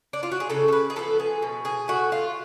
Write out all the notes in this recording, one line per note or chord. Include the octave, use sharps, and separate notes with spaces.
D4
F4
F#4
G#4
C#3 A4
A4
B4
G#4
F3 B3 A4
G#4
B2
G#4
A3 F#4
F4